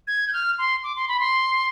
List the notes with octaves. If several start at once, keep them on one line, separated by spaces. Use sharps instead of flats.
G#6
G6
F6
C6
D6
C6
B5
C6